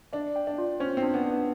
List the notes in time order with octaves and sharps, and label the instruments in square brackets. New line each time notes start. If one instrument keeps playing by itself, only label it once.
[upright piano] D4 [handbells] D5
[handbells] G5
[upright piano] D4
[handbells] F4
[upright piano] C#4 [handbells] C5
[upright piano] C4
[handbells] D4
[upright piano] B3
[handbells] D4
[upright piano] B3